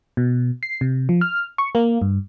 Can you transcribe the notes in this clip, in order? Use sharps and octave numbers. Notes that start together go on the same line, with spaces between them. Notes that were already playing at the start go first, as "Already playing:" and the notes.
B2
C7
C3
F3
F6
C#6
A#3
G2